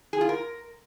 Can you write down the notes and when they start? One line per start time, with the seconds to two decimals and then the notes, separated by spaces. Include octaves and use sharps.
0.13 G#4
0.21 F4
0.29 A#4